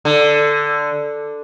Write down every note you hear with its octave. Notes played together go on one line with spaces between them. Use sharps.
D3